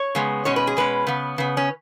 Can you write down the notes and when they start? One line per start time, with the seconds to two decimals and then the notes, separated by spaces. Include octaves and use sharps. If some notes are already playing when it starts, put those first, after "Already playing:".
Already playing: C#5
0.15 C#3 G#3 B3
0.45 B2 G#3 C#4 C#5
0.56 B4
0.67 G#4
0.77 B2 G#3 C#4 B4
1.07 C#3 B3
1.38 C#3 B3
1.57 C#4